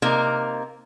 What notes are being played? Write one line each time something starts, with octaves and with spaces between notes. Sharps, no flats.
C3 A#3 D#4 A#4